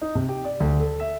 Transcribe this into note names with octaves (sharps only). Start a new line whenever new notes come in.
D#4
C3
G4
D5
D2
A4
E5